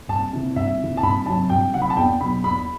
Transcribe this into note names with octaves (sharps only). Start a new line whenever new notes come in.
C2 A5
C3 E3
C2 E5
C3 E3
A5
C2 B5
C3 F#3 A5
C2 G5
C3 F#3 F#5
B5
A5
E2 G5
B2 F#3 B5
E2 B5